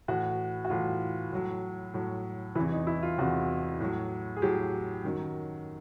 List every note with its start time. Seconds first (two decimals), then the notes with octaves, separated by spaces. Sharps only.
0.08 A2 E3 F#4
0.65 F#4
0.70 A2 E3 F4
1.32 A2 F#3
1.94 A2 F#3
2.55 E3 E4
2.59 E2 C3
2.72 D#4
2.87 E4
3.03 F4
3.18 E2 C3 E3 F#4
3.80 A2 F#3
4.36 G#4
4.42 A2 F#3 G4
5.04 F#2 D#3 F#3